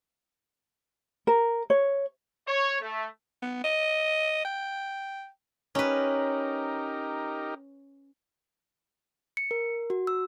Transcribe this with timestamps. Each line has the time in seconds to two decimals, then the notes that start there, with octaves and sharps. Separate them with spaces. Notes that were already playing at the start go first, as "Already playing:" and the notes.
1.27 A#4
1.70 C#5
2.48 C#5
2.81 A3
3.42 B3
3.64 D#5
4.45 G5
5.75 C#4 D#4 G4 A#4 B4
9.37 C#7
9.51 A#4
9.90 F#4
10.07 E6